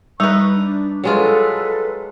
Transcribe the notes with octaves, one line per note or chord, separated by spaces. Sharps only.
G3 D#4 B4 C#6
D4
F#3 G#3 F4 A4 B4